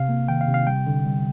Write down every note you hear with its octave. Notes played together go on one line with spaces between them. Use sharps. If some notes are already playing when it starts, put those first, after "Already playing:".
Already playing: C3 F5
A#3
D#3 G5
F5
C3
F5
G3 G5
D3
G3